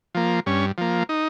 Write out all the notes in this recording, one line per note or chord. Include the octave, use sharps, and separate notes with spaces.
F3 A#3
G2 C#4
F3 A#3
D#4